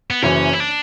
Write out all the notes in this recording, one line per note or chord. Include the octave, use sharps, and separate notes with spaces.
B3
F#1 F#2 E3 C#4
E4
D4